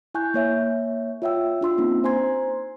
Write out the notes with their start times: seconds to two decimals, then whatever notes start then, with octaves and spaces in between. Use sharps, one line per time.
0.14 E4 G#5 C#6 F#6 G6
0.34 A#3 C#5 E5
1.22 F4 C#5 E5 F#5 G5 E6
1.61 D4 F4 C6 E6
1.78 A#3 C4 C#4 D#4
2.04 C5 G#5 A#5 C6 G#6